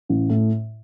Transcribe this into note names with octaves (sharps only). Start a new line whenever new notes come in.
A1
A2